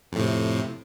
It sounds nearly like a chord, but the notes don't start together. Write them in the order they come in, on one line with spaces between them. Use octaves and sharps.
F2 A2 C3